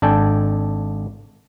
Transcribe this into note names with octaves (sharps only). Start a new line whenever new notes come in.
G#1 D4 A4 G5 G#5